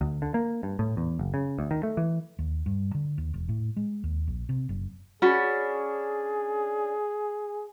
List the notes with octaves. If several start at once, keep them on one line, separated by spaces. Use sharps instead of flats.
D2
D3
A#3
G2
A2
E2
F#1
C#3
D2
D#3
A3
E3
D#2
G2
D3
D#2
E1
A2
G#3
D#2
A#1
C3
F#1
C#4 D4 F#4 G#4 B5